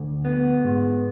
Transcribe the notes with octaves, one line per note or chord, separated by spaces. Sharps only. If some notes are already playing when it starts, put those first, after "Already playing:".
Already playing: D2
B3
G#2